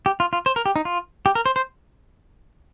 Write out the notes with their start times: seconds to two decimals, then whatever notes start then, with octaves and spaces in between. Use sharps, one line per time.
0.06 G4
0.20 F4
0.33 F4
0.46 C5
0.56 A#4
0.66 G4
0.76 D#4
0.85 F4
1.26 G4
1.35 A#4
1.46 C5
1.56 C5